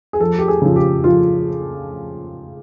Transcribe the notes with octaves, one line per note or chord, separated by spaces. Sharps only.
G#4
F2 A4
G4
G#4
C#3 F3
G4
F2 F4